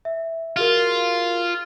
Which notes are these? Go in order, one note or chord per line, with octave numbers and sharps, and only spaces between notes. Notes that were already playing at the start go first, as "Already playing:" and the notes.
E5
F4 F#4 G#4 A#4